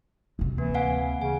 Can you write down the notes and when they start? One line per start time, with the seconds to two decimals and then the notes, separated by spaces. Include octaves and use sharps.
0.39 D2 C3
0.58 E3 A#3
0.74 F5 F#5 G#5
1.22 C#3 G#5